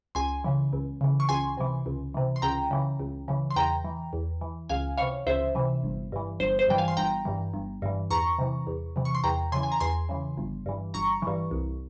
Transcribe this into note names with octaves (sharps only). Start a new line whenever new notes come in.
C#2 G#5 C6
C#3 E3
C#2
C#3 E3
C#6
C#2 G#5 C6
C3 E3
C#2
C3 E3
C6
C#2 G5 A#5
C#3 E3
C#2
C#3 E3
C6
E2 G5 A#5
E3
E2
E3
C#2 F5 G#5
C3 E3 C#5 F5
C#2 C5 E5
C3 E3
G1
G2 E3
G1 C5
C5
G2 E3 G5
F5 G#5
C6
G1 G5 A#5
G2 E3
G1
G2 E3
E2 A#5 C#6
C3 E3
E2
C3 E3
C#6
C6
E2 G5 A#5
C#3 E3 G#5 C6
G#5
A#5
E2 G#5 C6
C#3 E3
G1
G2 E3
G1 A#5 C#6
G2 E3
C2